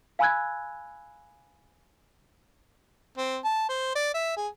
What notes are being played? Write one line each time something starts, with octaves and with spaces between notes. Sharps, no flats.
F5 G#5 B5 E6 F#6 G#6
C4
A5
C5
D5
E5
G#4